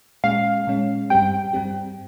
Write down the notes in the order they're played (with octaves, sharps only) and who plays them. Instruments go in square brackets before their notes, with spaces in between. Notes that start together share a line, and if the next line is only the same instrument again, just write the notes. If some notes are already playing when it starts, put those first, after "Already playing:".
[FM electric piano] A#2 G#3 C#4 [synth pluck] F5
[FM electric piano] A#2 G#3 C#4
[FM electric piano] G2 G3 C4 G4 [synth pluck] G5
[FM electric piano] G2 G3 C4 G4